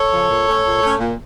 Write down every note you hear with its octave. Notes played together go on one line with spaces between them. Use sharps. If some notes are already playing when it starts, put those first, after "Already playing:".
Already playing: A4 C#5
C#3 F3
A#2
A3 C#4
A#2
A3 C#4
A#2